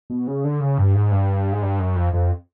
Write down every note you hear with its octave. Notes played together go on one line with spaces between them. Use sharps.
B2
C#3
D3
C#3
G2
G#2
G2
G#2
G2
F#2
F2
F2